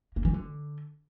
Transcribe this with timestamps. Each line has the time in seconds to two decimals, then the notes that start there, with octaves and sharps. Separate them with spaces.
0.16 A#3
0.25 E3
0.33 D3